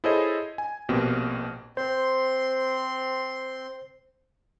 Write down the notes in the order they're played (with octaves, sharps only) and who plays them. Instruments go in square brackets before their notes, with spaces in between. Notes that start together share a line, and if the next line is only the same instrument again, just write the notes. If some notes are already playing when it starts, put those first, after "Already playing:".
[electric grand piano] E4 G#4 A4 C5 C#5 D#5
G#5
A#1 B2 A#3 C4 G4
[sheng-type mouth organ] C4 C6 [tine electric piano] C5